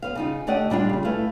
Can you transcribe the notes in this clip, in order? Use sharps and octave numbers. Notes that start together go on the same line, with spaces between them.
B3 C5 F5
C#3 D#4 F4
D3 A3 G4 D5 D#5 F#5
A#2 G3 D4 F4
C#3 G3
A3 E4 B4 F5